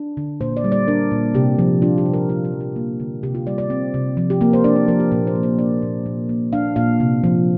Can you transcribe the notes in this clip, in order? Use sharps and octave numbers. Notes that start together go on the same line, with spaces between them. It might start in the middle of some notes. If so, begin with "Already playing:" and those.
Already playing: D4
D3
A#2 C5
D5
G3
D5
D4 A#4
A#2
C3 G4
F3
D4 F4
G4
C3
A#4
D4 F4
G4
F3
A#4
A#3
D3
C3 G4
F4
G3 D5
D5
C4
C3
F3
G4
A#3 A#4
C5
D4 D5
C5
F3 A#4
G4
A#2 A#4
C5
F3
C5
D4 D5
A#2
A#2
A#3
D4 F5
A#2 F5
C3
F3